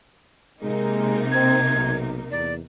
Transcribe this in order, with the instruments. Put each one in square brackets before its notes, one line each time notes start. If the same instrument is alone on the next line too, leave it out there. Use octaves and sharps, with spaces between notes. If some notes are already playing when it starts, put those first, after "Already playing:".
[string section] C3 A#3 D#4 [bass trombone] G#3
[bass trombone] C4 [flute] G#6
[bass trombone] B1
[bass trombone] E2 [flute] D5